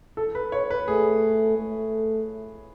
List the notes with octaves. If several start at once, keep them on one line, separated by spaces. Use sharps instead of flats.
A4
B4
C#5
B4
A3 G#4
A3